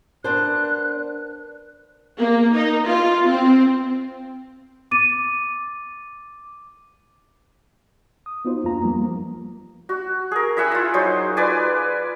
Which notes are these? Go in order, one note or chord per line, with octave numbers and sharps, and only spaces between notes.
B3 D4 A#4 C5 F#6
A#3
D#4
F4
C4
D6 A6 D#7
D#6
B3 D#4 F4 F#4 C5
F2 A#3 B3 D4 F4 A#5
F3 G3 A#3
F#4
G#4 A#4
E4 E5 F#5 G#5
E4 F4
F#3 D#4 C5
F4 B4 D5 G#5